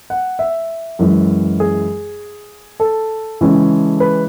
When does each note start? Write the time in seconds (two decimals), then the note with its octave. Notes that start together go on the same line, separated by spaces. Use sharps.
0.10 F#5
0.39 E5
0.99 F#2 E3 G#3
1.60 G#4
2.80 A4
3.41 C#3 E3 G#3 C#4
4.00 B4